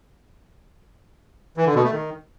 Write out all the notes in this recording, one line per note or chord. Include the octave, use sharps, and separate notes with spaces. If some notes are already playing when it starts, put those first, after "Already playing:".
E3
D3
B2
A3
D#3